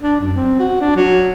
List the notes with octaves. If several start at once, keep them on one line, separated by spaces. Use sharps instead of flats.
D4
F#2
C4
F#4
D4
F#3